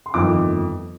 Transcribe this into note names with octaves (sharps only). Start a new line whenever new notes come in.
C6
G1 F2 D#3 D6